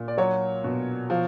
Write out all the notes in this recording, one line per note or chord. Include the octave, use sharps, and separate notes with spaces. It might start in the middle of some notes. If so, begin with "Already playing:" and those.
Already playing: A#2
D5
F#3 C#5
B2
F3